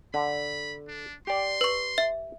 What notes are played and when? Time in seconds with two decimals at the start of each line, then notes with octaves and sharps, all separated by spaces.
0.14 D3 B5
0.88 D4
1.27 G4 D5 C6
1.61 B4 C#6
1.98 E5